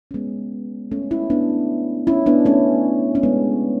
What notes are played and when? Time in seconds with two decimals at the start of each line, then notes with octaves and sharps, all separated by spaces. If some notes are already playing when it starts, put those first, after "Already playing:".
0.11 C#4
0.14 G#3 B3
0.91 A3 C#4
1.11 C#4 E4
1.30 B3 D4
2.07 C#4 E4
2.26 B3 D4
2.45 A3 C#4
3.15 C#4
3.23 G#3 B3